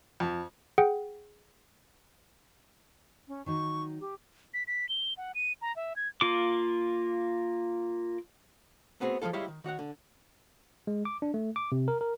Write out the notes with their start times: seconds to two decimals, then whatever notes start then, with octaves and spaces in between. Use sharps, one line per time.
0.20 F2
0.78 G#4 F#5 G5
3.28 C#4
3.46 D#3 F#3 D#4 C#6
4.00 G4
4.54 B6
4.67 B6
4.89 G7
5.18 F#5
5.35 D#7
5.62 A#5
5.76 E5
5.96 G#6
6.21 A#3 F4 D6
9.00 A3 B3 C4 F4 F#4 G#4
9.22 F3 G3 G#3 F4 A4
9.33 G3 G#3 E4 F4 G4 C#5
9.48 D#3
9.64 D#3 F#4 C#5 F#5
9.79 D3
10.87 G#3
11.05 D6
11.22 D4
11.34 A3
11.56 D6
11.72 C3
11.88 A#4
12.01 A#4